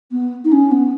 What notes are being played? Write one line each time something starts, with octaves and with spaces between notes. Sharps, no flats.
B3
D#4
C#4
B3